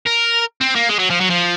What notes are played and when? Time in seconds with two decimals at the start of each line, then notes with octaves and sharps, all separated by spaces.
0.07 A#4
0.61 C4
0.75 A#3
0.89 G#3
0.99 F#3
1.10 F3
1.20 F#3
1.30 F3